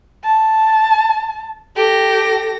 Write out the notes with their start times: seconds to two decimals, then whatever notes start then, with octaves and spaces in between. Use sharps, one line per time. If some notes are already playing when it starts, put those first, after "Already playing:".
0.24 A5
1.76 G4 A4 A#6